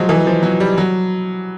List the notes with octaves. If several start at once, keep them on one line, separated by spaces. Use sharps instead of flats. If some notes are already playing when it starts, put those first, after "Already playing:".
Already playing: F3 F#3 G#3
E3
F3
F#3
G3
F#3